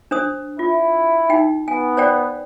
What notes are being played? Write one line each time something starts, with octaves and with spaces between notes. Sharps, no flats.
D4 C5 D#6
E4 F4
D#4 G5
B3 G#5
C5 D5 G5